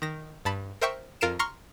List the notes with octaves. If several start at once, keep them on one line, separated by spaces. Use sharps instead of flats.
D#3 A#6
G2 A5 B5
A#4 C5 E5 G5 C#6
F2 F4 A#4 C7 D7 E7
A#5 C6 C#6 F6